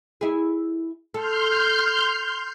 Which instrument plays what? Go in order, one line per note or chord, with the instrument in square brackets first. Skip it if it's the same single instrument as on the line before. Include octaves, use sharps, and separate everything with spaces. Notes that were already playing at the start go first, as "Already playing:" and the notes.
[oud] E4 G#4
[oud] A4 [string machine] C6 F6 G6